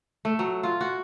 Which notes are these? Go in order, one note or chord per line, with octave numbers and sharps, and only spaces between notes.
A3
F#3
F4
F#4